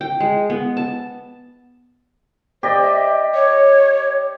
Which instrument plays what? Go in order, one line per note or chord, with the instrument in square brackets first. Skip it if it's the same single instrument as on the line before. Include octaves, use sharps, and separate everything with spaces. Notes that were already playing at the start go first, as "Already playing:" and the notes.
[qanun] G5
G#3
B3
A5
[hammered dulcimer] G4 D5 D#5 [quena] C5
[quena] E5
C#5